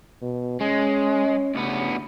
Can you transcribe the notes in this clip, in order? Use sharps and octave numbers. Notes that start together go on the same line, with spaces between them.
B2
G#3 C#4
D2 C#3 B3